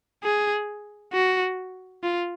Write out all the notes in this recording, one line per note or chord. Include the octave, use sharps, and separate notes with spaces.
G#4
F#4
F4